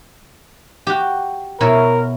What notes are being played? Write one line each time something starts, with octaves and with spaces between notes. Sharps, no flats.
F#4 G4
B2 E4 A#4 C#5